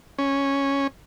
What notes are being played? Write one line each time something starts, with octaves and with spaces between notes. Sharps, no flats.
C#4